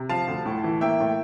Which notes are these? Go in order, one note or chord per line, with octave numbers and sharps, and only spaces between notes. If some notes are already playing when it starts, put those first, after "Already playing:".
Already playing: C3
F3 F5 A5
D2
A2
E3
A#3 E5 G5
A2